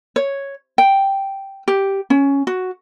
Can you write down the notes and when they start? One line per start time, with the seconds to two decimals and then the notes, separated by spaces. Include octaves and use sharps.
0.16 C#5
0.78 G5
1.68 G4
2.10 C#4
2.47 F#4